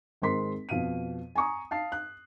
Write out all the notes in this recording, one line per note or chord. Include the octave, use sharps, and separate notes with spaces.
G#1 G#3 C4 A#4 C6 B6
F2 B2 F5 D#7
G#5 A#5 C#6 D#6
F5 A5 C7
F#6